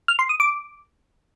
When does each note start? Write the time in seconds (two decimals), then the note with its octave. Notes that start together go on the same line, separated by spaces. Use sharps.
0.08 F6
0.19 C6
0.29 D#6
0.40 D6